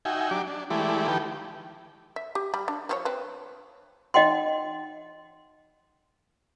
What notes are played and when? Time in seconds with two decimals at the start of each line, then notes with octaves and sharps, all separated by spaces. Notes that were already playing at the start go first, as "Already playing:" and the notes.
0.05 D#4 F#4 E5 G5 G#5
0.31 F#3 D4 G4 D6
0.47 D4
0.70 E3 G#3 A3 E4 G4 D5
1.08 D#3 F3 G4 A4 B4 G5
2.16 E5
2.35 G4
2.54 G3 B5
2.68 D4
2.89 F3 C4 C#5
3.05 C4 B4
4.14 D#4 D#5 F#5 G5 C6